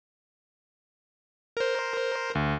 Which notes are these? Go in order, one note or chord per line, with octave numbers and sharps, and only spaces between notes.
A#4 C5
D2